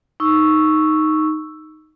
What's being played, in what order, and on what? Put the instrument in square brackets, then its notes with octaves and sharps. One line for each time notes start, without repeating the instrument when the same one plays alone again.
[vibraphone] D#4 C#6 E6